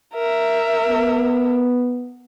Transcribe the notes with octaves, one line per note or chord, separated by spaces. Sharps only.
A#4 E5
B3